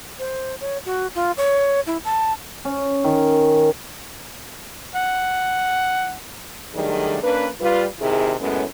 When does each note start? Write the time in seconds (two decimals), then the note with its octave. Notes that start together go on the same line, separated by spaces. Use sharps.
0.19 C5
0.61 C#5
0.85 F#4
1.15 F4
1.37 C#5
1.87 E4
2.05 A5
2.65 C#4
3.04 D#3
4.96 F#5
6.74 D#3 F#3 G3 A3 D4 G#4
7.22 A#3 C#4 D4 B4
7.61 G3 F4 B4
8.00 C3 D#3 E4 G#4
8.40 F#2 A2 G#3 A3 B3 C#4